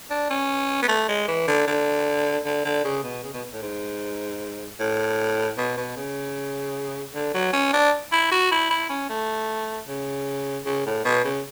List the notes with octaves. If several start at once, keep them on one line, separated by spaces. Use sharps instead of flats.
D4
C#4
B3
A3
G#3
E3
D3
D3
D3
D3
C#3
B2
C#3
B2
A2
G#2
A2
B2
B2
C#3
D3
F#3
C#4
D4
E4
F#4
E4
E4
C#4
A3
C#3
C#3
A2
B2
C#3